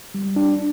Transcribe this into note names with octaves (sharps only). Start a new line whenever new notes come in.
G3
D4